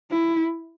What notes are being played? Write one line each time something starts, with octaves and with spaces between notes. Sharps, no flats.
E4